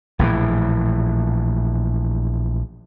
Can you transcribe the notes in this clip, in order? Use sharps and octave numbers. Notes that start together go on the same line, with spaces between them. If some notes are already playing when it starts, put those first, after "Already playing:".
A#1 A2 D#3 E3